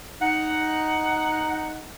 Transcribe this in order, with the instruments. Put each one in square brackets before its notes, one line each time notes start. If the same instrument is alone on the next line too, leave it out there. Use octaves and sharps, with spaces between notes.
[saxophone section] D#4 F#5